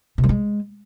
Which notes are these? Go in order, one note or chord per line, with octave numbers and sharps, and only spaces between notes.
C3
G3
G#3